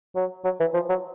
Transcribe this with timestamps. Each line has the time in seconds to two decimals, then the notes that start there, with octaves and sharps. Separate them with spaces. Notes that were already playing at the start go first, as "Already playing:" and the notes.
0.15 F#3
0.44 F#3
0.60 E3
0.74 F3
0.89 F#3